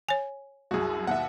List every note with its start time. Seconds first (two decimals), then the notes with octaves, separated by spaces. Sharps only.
0.09 C#5 G#5
0.71 C2 F#2 F#4 G#4
1.07 D#2 B2 E5 F#5 C#7